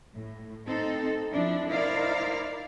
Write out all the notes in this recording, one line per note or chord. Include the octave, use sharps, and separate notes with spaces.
A2
C4 D#4 A4
F3 D4 E4
D#4 E4 A#4 C5 D5 F5